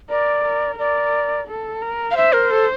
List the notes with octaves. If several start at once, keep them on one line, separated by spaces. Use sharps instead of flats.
A#4 D5
A#4
A#4 D5
A4
A#4
F5
C5 E5
A#4
A4